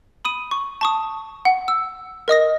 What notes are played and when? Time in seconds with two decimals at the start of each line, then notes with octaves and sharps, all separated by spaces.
0.25 B5 D#6 D#7
0.51 C#6
0.81 A5 C#6 D#6
1.45 F#5
1.68 E6
2.28 A#4 D#5 D#6 A#6